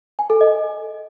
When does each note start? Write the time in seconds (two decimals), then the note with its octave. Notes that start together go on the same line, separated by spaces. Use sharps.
0.19 G#5
0.30 A4
0.41 D#5